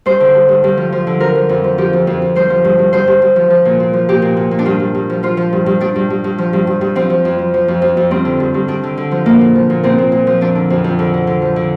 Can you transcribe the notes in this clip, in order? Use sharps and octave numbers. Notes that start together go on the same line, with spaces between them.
G2 C5
D3
G2
G2
G2
F3
F3
D3
F3 A#4
F3
F2
F3
F3 G4
F2
F2
F2
G2 C5
F3
G2
G2
G2 C5
G2
G2
F3
F3
A#2
A#2
F3
A#2 G4
A#2
A#2
A#2
D4
G2 F4
G2
G2
F3
F3 F4
F3
G2
G2
G2 D4
G2
G2
G2
F3
G2
G2
G2
F3 C4
F3
F2
F3
F3
F2
F2
F2
G2 C4
D3
G2
G2
G2 D4
D3
D3
F3
A#2 A#3
A#2
F3
A#2
A#2 C4
A#2
A#2
F3
F2 D4
D3
F2
F2
D3
D3
D3
F3
D3